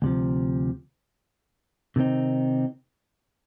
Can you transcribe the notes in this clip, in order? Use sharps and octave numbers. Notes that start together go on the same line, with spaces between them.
D2 C3 F3
C3 D#3 G3 C4 D#4